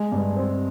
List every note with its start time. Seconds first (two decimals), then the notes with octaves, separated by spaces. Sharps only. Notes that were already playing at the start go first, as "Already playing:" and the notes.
Already playing: G#3
0.12 G2
0.37 C4